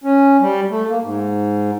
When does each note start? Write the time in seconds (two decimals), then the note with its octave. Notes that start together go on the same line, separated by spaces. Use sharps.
0.04 C#4
0.41 G3
0.71 A3
0.89 A#3
1.03 G#2